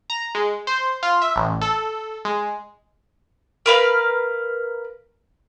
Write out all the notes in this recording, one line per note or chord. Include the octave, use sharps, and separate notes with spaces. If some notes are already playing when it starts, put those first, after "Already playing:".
A#5
G#3
C5
F4
E5
A1
A4
G#3
A#4 B4 F5